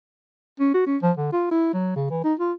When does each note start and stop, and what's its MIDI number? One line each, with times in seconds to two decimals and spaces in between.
0.60 0.71 61
0.74 0.85 66
0.86 0.97 61
1.03 1.12 53
1.17 1.31 50
1.33 1.48 65
1.51 1.73 64
1.74 1.94 54
1.96 2.10 49
2.10 2.24 52
2.24 2.34 63
2.40 2.53 65